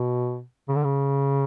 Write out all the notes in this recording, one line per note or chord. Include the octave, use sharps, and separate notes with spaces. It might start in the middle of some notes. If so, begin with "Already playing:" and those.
Already playing: B2
C#3
D3
C#3